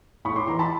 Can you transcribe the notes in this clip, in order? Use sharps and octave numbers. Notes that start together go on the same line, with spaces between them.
A2 B5 C#6
C6 D6
E3 A#5 C6
A5 B5